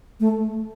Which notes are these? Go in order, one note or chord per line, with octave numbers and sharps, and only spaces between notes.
A3